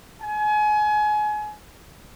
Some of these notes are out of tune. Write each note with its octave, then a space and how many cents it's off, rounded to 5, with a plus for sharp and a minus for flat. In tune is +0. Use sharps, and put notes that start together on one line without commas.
G#5 +30